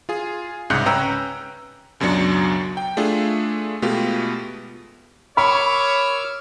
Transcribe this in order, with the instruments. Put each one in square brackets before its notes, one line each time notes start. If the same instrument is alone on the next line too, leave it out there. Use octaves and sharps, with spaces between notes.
[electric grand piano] F4 G#4
C2 G#2 C#3 F#6 G6 C#7
C#4 B4 G5 A#5 E6
C#2 F#2 B2 F#3 D4 C#7
G5
A3 D4 F4 G#4
B2 G#3 A3 B3 F4 G4
[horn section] A#4 C#5 [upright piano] B5 [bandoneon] D6 E6 F6